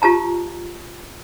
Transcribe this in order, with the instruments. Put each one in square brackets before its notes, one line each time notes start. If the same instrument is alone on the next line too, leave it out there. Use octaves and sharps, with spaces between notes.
[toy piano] F4 G4 A5 A#5